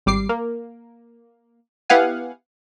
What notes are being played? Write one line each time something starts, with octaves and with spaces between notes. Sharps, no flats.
G#1 G3 D6 C7
A#3
B3 E4 G4 F5 F#5 G#5